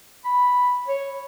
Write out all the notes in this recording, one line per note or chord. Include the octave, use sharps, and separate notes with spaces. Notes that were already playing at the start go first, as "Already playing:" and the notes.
B5
C#5